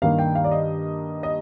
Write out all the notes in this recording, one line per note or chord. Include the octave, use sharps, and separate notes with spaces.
G2 D#3 G3 A#3 F5
G5
F5
D5
D#5
D#5